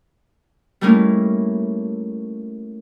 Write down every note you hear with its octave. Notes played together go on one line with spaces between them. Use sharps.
G3 A3 A#3 C#4 D#4 E4